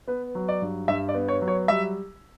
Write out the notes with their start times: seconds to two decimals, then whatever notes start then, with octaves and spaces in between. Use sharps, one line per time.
0.07 B3 B4
0.35 F#3
0.48 D5
0.62 G2
0.88 G2 E5
1.09 D5
1.14 B3
1.28 C#5
1.42 F#3
1.48 C#5
1.68 G3 E5